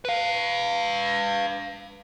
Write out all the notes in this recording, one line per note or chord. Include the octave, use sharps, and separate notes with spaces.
B4 F5